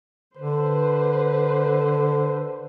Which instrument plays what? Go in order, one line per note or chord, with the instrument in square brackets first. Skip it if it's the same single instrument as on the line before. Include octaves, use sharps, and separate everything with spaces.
[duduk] D3 [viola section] B4 C5